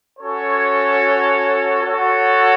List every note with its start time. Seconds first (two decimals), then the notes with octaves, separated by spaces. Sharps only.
0.18 C#4 F#4 A4 C#5
1.82 F#4 A4 C#5 F#5